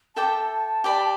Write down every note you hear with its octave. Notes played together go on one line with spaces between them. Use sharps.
A4 E5 G5 A5 D6
G4 D5 B5